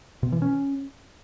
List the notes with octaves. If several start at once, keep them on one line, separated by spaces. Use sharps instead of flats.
B2
E3
C#4